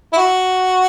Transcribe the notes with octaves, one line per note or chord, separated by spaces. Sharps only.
E4
F#4